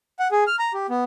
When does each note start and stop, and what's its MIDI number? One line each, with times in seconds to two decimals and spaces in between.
0.19 0.28 78
0.31 0.44 68
0.47 0.56 89
0.59 0.72 82
0.74 0.87 67
0.90 1.04 59